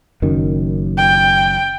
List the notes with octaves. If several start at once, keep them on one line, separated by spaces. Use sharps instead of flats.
F#1 F#2 D#3
G5